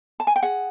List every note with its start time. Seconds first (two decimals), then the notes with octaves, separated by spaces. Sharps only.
0.20 A5
0.27 G#5
0.36 G5
0.43 G#4 F#5